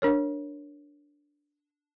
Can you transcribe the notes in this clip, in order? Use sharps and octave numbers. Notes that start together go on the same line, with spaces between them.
D4 A#4 C#5